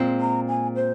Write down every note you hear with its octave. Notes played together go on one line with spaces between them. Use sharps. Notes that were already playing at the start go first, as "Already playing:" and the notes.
Already playing: A#2 G#3 C4
A#5
G#5
C5